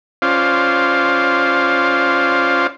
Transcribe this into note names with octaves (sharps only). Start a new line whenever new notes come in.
C#4 F4 C5 D5 F5